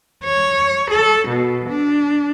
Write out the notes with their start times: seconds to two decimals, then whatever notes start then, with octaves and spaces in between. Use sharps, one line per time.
0.24 C#5
0.90 A4
1.28 B2
1.68 D4